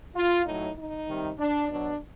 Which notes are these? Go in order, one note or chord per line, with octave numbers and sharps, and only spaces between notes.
F4
A2 F#3 D#4
D#4
C3 D#3 G3
D4
B2 F#3 D4